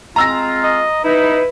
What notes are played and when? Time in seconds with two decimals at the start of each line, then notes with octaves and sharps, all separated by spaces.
0.16 G#3 C4 F4 A#5 E6 A#6
0.63 D#5
1.04 D#4 E4 B4